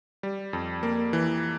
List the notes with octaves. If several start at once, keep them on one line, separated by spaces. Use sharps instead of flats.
G3
F2
A#3
E3